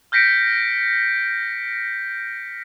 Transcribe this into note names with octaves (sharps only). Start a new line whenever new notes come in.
F6 G6 A#6 B6 C#7 D7